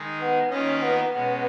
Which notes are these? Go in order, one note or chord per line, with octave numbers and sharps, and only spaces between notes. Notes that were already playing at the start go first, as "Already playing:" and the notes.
Already playing: D#3 G#3 D#4 G#4
B3
D#3 A#3 C#4 F4 B4 D#5
B3
B2 G#3 B3 C#4